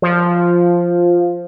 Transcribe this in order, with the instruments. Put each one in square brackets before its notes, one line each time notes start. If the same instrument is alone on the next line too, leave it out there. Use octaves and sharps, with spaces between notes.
[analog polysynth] F3